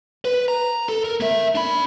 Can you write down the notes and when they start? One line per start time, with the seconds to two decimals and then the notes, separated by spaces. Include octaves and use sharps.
0.25 B4
0.48 A#5
0.89 A4
1.04 A#4
1.20 A#3 E5
1.55 D4 B5